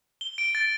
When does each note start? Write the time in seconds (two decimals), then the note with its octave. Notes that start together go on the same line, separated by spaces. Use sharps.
0.21 G7
0.38 D7
0.55 A6